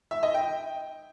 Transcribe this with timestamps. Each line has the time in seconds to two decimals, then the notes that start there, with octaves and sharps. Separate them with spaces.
0.11 E5
0.23 D#5
0.34 G5